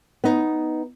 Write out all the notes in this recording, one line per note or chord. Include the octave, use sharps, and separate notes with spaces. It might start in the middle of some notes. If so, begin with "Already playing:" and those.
B3 D#4